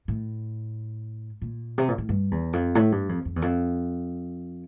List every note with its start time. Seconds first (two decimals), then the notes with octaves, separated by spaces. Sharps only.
0.08 A2
1.42 A#2
1.78 C3
1.88 A#2
1.98 A2
2.09 G2
2.31 E2
2.53 F2
2.75 A2
2.92 G2
3.09 F2
3.25 F2
3.36 E2
3.42 F2